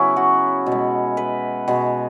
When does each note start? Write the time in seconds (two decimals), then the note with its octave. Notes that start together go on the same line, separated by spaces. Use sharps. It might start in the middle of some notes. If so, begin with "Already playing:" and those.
Already playing: C#3 F#3 B3 C#4 E4
0.17 F#4
0.66 B2
0.72 G#3
1.17 B4
1.68 B2 G#3